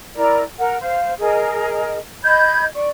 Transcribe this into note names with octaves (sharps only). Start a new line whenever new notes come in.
E4 A#4 D5 A#5
A#4 F#5
C5 F5
G#4 A#4 D#5
D#5 B5 G6 G#6
D5 C#6